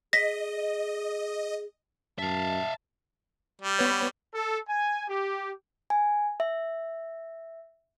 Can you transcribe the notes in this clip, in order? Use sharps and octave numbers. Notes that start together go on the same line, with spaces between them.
G#4 D#5 A#6 B6
F#2 E5 F5 A5
G3
B3 B4 C#5
A4
G#5
G4
G#5
E5